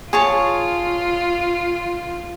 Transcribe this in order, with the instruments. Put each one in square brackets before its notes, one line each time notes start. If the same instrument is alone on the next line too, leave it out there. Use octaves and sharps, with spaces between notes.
[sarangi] F4 [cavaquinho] G#4 C#5 A5